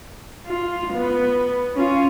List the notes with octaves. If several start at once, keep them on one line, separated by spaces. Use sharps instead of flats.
F4
B3
C#4 F4